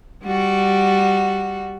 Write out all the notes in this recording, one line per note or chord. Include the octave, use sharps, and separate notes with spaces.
G3 F#4